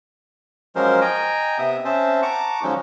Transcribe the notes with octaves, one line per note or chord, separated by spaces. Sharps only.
F3 F#3 G#3 C#4 A#4 C5
D#5 G5 G#5 A#5
C3 B3 E5 D#6
C4 C#4 C5 E5 A5
F#5 A5 A#5 C#6 D6
D3 F3 F#3 G#3 C#4 D#4